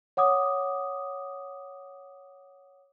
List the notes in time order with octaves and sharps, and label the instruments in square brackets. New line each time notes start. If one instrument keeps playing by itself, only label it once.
[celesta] C#5 F#5 D6 D#6